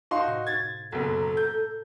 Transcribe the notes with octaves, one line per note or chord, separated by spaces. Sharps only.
D#4 F#4 F5 A5 C6
A2 C3
G#6 A6
F#1 B1 A4
A#5
G6